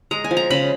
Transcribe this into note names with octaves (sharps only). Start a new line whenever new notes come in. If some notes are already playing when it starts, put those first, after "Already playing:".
G#3 A#5
G#5
F3
A#5
C#3 B5